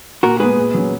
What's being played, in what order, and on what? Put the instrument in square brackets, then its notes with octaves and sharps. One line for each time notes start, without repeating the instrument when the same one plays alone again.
[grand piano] A#2 [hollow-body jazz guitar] F#4 A#4
[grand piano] G#3 B3 [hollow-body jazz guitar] G#4 B4
[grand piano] A#2
F#3 C#4